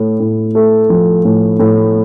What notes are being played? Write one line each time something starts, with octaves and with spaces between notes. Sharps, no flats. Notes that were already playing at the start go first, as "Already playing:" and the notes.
Already playing: A2 A3
A2
A3
F3
A2
A2